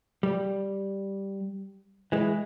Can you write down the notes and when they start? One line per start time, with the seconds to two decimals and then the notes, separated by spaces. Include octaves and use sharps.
0.23 G3
2.12 E3 G#3